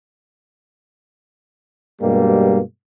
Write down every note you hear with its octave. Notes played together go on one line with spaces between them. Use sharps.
G2 B2 G3 G#3 A#3